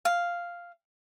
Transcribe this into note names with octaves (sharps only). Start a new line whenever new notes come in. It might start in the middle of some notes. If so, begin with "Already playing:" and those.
F5